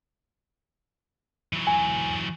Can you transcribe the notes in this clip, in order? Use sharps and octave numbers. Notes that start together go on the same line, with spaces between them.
E3 F#3
G#5